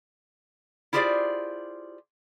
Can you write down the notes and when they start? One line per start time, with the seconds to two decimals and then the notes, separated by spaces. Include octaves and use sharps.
0.93 E4 F4 G4 G#4 C5 D5